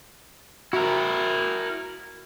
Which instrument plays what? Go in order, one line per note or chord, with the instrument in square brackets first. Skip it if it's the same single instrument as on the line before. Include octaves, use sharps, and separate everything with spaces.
[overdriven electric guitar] E4 A#4 [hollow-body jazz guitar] F#4